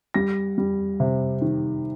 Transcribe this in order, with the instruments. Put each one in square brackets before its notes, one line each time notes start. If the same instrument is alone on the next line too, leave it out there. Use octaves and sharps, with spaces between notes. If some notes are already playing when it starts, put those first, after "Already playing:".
[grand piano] G3 A#6
G3
C3
D#3